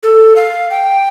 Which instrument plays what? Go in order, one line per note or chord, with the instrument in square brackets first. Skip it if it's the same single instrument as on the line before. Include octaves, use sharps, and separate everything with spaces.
[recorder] A4
F5
G5